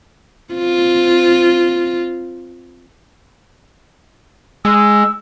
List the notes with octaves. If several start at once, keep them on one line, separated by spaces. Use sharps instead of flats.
C4 F4
G#3 E6